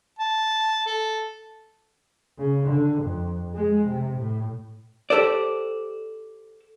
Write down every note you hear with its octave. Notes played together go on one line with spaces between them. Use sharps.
A5
A4
C#3
D3
F2
G#3
C3
A2
G4 A4 C5 D5